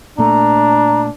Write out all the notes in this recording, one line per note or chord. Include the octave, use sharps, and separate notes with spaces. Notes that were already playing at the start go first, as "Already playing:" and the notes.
A#2 A3 D4 A#5